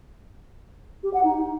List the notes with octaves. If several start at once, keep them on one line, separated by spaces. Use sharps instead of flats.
G4
F#5
D#4